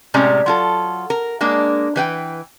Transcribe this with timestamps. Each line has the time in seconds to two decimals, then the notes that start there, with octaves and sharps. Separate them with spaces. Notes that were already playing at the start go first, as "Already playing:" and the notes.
0.14 A2 C3 G#3 C#4 D5 A#5
0.46 F#3 F4 A4
1.10 A#4
1.41 G#3 A#3 D4
1.96 E3 B4 G5